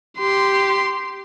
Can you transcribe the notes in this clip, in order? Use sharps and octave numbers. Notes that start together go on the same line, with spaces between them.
G4 C6